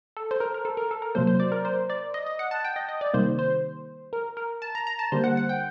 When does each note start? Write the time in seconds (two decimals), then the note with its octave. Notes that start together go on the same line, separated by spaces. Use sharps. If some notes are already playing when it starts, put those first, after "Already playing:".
0.17 A4
0.31 C5
0.40 A#4
0.54 A#4
0.65 A4
0.77 A#4
0.91 A4
1.02 A#4
1.15 C3 F#3 A#3 C5
1.27 C5
1.40 D5
1.52 A#4
1.65 C5
1.90 D5
2.14 D#5
2.27 D#5
2.39 F#5
2.51 A5
2.65 G5
2.76 D#5
2.89 D#5
3.01 D5
3.14 C3 D#3 G3 A#3 C5
3.39 C5
4.13 A#4
4.37 A#4
4.62 A5
4.75 A#5
4.87 A#5
4.99 A5
5.12 D3 G3 A#3 C5
5.24 F#5
5.37 F#5
5.49 G5